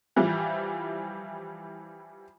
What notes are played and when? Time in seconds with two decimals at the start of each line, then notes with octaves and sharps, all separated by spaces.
0.16 E3 F3 G3